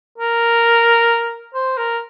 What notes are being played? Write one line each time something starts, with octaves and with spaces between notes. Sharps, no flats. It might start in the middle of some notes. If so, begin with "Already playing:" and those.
A#4
C5
A#4